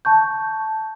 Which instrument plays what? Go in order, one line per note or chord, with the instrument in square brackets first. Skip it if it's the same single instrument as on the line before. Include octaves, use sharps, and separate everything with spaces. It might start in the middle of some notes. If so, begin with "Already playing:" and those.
[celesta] A5 C#6 G6